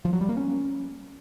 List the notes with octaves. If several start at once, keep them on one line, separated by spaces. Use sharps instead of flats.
F3
F#3
G3
A#3
C#4